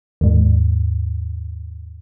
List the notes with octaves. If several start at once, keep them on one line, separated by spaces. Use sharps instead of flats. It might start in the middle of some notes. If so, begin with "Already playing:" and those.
D#2 G#2